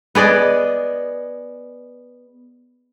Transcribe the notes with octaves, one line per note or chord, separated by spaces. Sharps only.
B3 G#4 D5 D#5